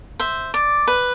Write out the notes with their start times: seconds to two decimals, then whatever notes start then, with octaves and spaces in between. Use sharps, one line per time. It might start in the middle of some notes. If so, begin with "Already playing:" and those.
0.19 C5 E5
0.54 D5
0.87 B4